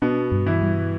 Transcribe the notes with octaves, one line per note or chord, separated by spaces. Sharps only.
B2 B3 D4
G2
E3 E4
G3